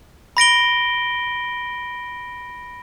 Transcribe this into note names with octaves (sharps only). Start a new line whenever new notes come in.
B5 A#6 D7 G7